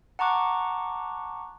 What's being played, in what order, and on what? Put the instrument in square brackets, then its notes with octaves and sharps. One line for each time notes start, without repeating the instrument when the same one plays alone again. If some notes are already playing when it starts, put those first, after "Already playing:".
[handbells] F#5 A5 A#5 C#6 D6 F#6